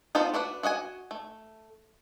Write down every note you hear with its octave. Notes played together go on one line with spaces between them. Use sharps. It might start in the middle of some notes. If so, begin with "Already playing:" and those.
B3 D#4 F4 A4 C5
D4 F#4 B4 F#5
F#4 D#5 F#5 G#5
A3